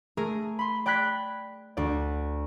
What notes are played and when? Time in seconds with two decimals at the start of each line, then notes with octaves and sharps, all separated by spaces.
0.17 A3 G#4 A#4
0.59 B5 C6
0.86 D5 G5 B5 F#6 G#6 B6
1.77 D2 D5